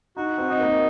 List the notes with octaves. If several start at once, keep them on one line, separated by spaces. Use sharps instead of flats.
D#4 F#4
C4
D#4
A#3